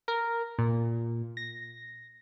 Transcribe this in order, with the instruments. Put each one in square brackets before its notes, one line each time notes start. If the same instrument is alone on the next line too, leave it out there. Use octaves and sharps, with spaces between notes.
[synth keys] A#4
A#2
A#6